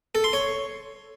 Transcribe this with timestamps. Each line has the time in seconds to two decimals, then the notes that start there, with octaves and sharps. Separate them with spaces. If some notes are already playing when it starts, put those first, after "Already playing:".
0.15 A4
0.24 C6
0.33 C#5